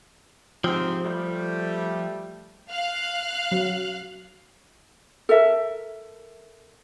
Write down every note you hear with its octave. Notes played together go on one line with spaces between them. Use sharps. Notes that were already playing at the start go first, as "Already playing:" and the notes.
G#2 C3 F3 C4
G3 A3
F5 F#6
F#3
A4 A#4 E5